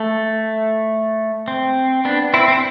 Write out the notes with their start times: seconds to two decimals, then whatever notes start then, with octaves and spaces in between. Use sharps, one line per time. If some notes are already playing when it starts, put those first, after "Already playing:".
Already playing: A3
1.48 C4
2.05 B3 D4
2.34 C4 E4
2.48 C4